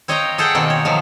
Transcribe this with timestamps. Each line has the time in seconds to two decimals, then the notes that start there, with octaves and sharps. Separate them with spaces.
0.08 C4 C#5 D#5 F5 G5 A#5
0.38 G#4 A4 F#5 G5
0.55 B2 D#3 A#3 C4
0.70 C#5
0.85 D#3 F3 F#3